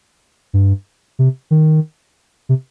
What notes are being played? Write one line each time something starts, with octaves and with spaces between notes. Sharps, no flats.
G2
C3
D#3
C3